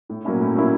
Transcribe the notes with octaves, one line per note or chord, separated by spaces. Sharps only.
A2
F#3 A#3 C#4 E4
A2
F#3 A#3 C#4 E4